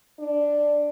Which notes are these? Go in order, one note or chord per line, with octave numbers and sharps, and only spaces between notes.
D4